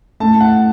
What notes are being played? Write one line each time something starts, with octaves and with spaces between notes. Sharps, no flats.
A2 A3 A5
F#5